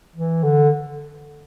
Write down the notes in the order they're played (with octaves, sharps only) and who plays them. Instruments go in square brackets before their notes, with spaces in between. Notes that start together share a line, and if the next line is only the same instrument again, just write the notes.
[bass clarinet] E3
D3